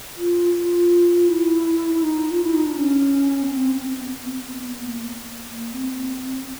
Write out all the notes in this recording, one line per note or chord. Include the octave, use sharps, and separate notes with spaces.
F4
F4
E4
E4
D#4
F4
E4
D#4
D4
C#4
B3
C4
C4
B3
C4
B3
B3
A#3
A#3
C4